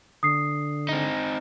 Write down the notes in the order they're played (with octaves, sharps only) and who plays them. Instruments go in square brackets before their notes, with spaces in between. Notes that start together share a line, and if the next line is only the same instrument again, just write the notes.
[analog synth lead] D3 [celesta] D#6 C7
[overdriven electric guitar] C4 D#4